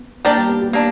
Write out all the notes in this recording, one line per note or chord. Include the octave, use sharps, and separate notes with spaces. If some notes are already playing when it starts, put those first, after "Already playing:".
Already playing: B3
A#3 D4 G4 A#4 D5
G3
B3
G4
A#3 D4